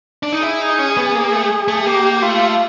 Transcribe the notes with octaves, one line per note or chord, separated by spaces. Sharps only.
D4
D#4
E4 G#4
D#4
C#4
B3
A#3
A3
A3
A#3 G4
A3 F4